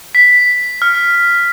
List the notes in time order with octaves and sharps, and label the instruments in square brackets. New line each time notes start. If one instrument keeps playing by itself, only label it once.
[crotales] B6
F6